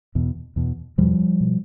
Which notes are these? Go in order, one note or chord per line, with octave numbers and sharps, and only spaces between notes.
E2 B2
E2 B2
E2 B2 F3 G3
B2